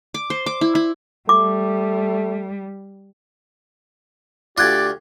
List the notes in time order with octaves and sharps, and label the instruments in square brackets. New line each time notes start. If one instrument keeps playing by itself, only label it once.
[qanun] D6
C5
D6
E4
E4
[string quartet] G3 [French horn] A3 [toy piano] D6
[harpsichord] D2 F4 [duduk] G4 [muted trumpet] D5 [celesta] D6 F#6 G#6